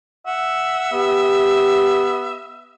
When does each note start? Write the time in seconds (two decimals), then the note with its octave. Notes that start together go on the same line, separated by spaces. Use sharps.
0.27 E5 F#5
0.92 B3 G4